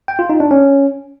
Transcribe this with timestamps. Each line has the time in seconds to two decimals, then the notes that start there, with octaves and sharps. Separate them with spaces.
0.08 G5
0.19 F4
0.30 D#4
0.40 D4
0.51 C#4